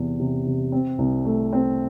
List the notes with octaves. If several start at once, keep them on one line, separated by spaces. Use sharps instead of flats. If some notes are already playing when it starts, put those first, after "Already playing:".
Already playing: E2 C3
C3
C3
C4
C2
A3
C4